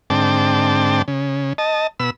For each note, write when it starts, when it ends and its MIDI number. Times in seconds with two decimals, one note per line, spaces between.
0.10 1.02 44
0.10 1.02 50
0.10 1.02 60
0.10 1.02 79
0.10 1.02 81
0.10 1.02 86
1.08 1.53 49
1.58 1.87 75
1.58 1.87 81
2.00 2.10 47
2.00 2.10 83
2.00 2.10 88